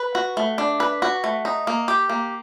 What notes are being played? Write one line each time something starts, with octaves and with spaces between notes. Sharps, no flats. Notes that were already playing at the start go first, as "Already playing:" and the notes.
Already playing: B4
F#4
A3
D4
B4
F#4
A3
D#4
A#3
G4
A#3